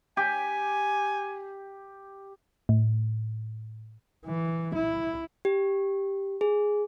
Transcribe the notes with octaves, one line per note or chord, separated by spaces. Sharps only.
G4 G#5
A2
E3
E4
G4
G#4